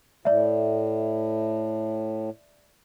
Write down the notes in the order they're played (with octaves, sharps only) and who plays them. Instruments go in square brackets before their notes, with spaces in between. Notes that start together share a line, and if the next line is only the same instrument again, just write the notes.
[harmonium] A2 [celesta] D5 E5